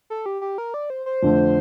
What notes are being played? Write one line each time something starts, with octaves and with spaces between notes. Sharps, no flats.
A4
G4
G4
A#4
D5
C5
C5
F2 D3 A3